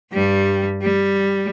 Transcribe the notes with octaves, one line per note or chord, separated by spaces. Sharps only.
G2 G3
G3